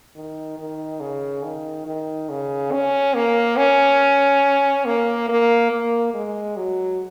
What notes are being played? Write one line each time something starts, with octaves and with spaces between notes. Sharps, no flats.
D#3
D#3
C#3
D#3
D#3
C#3
C#4
A#3
C#4
A#3
A#3
A#3
G#3
F#3